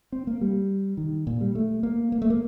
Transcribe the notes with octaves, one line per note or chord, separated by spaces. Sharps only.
C4
A#3
G3
D#3
A#2
G3
A3
A#3
A#3
A3
A#3